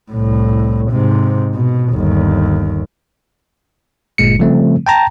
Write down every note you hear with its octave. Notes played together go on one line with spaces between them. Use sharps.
C2 A2
G#2 C3
B2
G1 D#2
G1 A#2 G#3 C#7
C#3 F3 G3 A3 C4
G5 A5 A#5